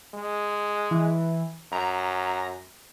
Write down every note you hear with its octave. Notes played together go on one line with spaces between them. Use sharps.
G#3
E3
F#2 A#5